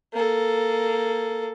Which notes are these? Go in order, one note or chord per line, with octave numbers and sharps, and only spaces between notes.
A#3 A4